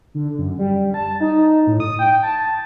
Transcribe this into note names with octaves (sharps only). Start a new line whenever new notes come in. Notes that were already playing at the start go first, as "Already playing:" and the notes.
D3
F#2
G3
A5
D#4
A2
D#6
G5
A5